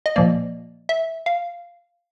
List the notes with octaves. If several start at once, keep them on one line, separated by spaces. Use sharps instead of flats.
D#5
A#2 F3 A#3 D5
E5
F5